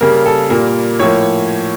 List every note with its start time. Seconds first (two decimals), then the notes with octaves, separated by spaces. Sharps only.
0.01 C#3 G3 A#3 A#4
0.25 A4
0.50 A#2 G3 A#3 A#4
0.99 A2 F3 A#3 C#5